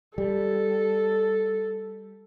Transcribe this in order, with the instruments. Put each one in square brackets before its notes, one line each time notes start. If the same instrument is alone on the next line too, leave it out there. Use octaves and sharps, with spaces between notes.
[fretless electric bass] G3 [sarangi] A4